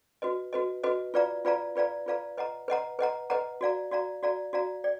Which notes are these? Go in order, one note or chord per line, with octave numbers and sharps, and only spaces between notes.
F#4 B4 D#5
F#4 B4 D#5
F#4 B4 D#5
F4 B4 D5 F5 A#5
F4 B4 D5 F5 A#5
F4 B4 D5 F5 A#5
F4 B4 D5 F5 A#5
B4 D#5 F#5 A#5
B4 D#5 F#5 A#5
B4 D#5 F#5 A#5
B4 D#5 F#5 A#5
F#4 D5 F5 A#5
F#4 D5 F5 A#5
F#4 D5 F5 A#5
F#4 D5 F5 A#5
D5